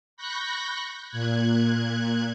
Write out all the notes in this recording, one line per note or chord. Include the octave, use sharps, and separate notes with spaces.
B5 C#6 F#6 G6 A#6 B6
A#2 F#6 G#6